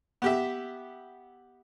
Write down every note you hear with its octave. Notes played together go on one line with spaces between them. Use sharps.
B3 G4 E5